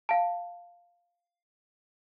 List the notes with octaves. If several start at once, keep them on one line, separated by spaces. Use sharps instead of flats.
F5 A5